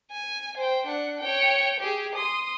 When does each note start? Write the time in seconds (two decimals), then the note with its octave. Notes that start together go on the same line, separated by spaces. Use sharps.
0.12 G#5
0.57 C5 G5
0.86 D4 F#5
1.20 C#5 G5
1.80 G4 G#4
2.15 C6 D#6